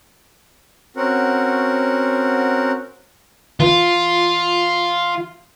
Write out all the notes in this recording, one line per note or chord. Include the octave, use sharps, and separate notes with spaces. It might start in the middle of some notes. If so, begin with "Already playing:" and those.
C4 C#4 F#4 A#4 F#5
E3 F4